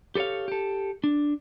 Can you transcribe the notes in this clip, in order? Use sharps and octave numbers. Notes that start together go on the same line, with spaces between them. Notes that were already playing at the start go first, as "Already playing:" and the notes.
G4 A4 B4 C#5 F5
G4 A4
D4